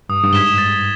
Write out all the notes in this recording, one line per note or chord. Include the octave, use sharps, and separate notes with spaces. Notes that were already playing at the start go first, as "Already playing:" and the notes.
G2 D#6
G2
G#2 G#6 B6 E7 G7
A6